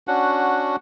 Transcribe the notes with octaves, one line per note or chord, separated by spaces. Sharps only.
C#4 D4 F#4 F#5